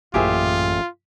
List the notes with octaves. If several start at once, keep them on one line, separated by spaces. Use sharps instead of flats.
A1 F#2 A#2 F4 G4 G#4 E5